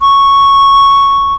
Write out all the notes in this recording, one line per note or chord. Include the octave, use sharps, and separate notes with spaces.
C#6